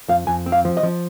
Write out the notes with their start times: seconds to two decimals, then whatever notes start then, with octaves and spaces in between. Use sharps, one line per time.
0.09 F2 F5
0.27 F2 G#5
0.46 C4
0.52 F5
0.65 F3
0.77 D#5
0.83 F3